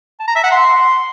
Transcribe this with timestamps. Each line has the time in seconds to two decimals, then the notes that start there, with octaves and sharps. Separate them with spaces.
0.20 A5
0.28 A#5
0.36 E5
0.43 F#5
0.51 C6